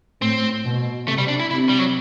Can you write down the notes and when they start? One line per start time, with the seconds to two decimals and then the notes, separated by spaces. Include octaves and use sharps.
0.22 A2 C4
0.65 B2
1.07 C3 A3
1.18 G3
1.28 D4
1.40 E4
1.51 C3 E4
1.69 G3
1.78 F#3